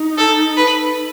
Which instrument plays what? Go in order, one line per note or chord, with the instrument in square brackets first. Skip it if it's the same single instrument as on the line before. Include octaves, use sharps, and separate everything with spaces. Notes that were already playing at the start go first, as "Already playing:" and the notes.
Already playing: [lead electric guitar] D#4
[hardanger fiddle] A4
B4